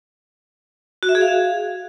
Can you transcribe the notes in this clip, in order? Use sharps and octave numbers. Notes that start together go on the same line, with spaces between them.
F#4
E5
G#4
F5